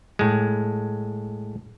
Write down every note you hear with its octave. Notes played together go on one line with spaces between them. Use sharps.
A2 G#3